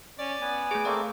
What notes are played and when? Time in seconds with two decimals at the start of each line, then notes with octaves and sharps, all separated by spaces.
0.19 C#4 D5
0.42 B3 G#5
0.71 A3 G#4 D6
0.85 A3 A#3 C4 D5